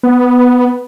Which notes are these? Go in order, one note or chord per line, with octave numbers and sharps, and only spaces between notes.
B3